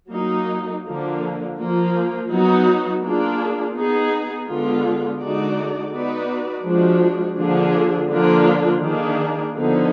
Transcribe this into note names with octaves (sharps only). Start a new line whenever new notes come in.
F#3 A#3 D#4
D3 F3 A#3
F3 A#3 F4
F#3 B3 D#4 F#4
A#3 D4 F4 G#4
B3 D#4 G#4
D3 G#3 B3 F4
D3 G#3 D#4 F#4 D5
B3 D#4 F#4 B4 D5
F3 G#3 D4 F#4
D3 F3 A#3 D4 G#4
D3 F3 A#3 D4 F4
D#3 A#3 D4 G#4
D3 F3 B3 D#4